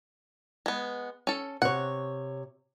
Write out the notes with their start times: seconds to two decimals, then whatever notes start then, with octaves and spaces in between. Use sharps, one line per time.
0.66 G#3 B3
1.27 C#4 A4
1.62 C3 C#5 F#5